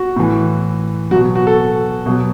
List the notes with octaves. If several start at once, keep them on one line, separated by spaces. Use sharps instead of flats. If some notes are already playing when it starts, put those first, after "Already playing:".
Already playing: F#4
A2 E3
B2 F#3 F#4
F#4
A4
B2 F#3